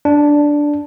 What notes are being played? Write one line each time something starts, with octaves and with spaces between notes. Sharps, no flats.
D4